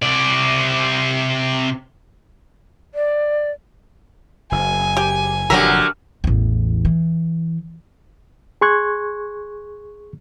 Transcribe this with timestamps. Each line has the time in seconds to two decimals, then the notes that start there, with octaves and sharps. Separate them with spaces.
0.03 C3 D5
2.95 D5
4.52 F#1 G#5
4.97 G4
5.50 F1 A#2 D3 F#3 G4 A#4 E5
6.24 A1 E2
6.85 E3
8.61 G#4 C6 C#6 F#6 G#6